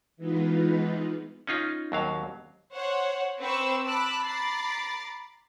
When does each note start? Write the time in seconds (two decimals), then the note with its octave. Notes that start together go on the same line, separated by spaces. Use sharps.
0.17 E3 G#3 B3 D#4 F4 B4
1.47 C#4 D#4 F4
1.92 D#2 F#3 F5
2.74 C5 C#5 F#5
3.40 C4 B4 C5 C#6 E6
3.87 A5 B5 D6 E6 F#6
4.26 A#5 B5 D6 A6 C7